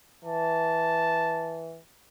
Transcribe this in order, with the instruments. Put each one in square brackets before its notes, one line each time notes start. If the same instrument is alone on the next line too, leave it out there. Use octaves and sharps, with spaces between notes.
[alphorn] E3 [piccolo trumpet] A5